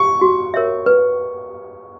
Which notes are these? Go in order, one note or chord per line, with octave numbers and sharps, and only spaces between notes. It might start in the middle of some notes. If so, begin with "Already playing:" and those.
Already playing: C#6
F#4
A#4 C#5 E5
B4